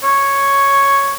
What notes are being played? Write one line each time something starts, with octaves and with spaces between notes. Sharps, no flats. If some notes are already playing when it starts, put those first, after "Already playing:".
C#5